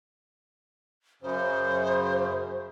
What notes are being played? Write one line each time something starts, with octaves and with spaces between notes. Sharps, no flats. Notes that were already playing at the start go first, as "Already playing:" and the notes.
F#2 C#3 C5